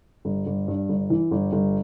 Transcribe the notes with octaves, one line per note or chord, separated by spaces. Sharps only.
G1
G1
G2
G1
E3
G1
G1